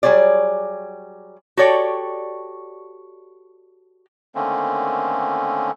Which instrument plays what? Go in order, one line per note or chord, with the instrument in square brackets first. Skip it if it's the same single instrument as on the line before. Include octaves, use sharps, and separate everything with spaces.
[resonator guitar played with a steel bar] F#3 G3 G#4 C#5 D5
F#4 G4 A4 C#5 D5 G5
[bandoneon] D3 D#3 A3 A#3 C4 C#4